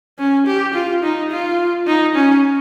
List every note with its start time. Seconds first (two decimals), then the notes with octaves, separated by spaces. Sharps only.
0.19 C#4
0.47 G4
0.74 F4
1.03 D#4
1.31 F4
1.87 D#4
2.15 C#4